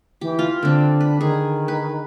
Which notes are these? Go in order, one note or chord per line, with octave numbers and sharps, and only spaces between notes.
E3 G4
F4
D3 C4 D4
B4
D#3 G#4
B4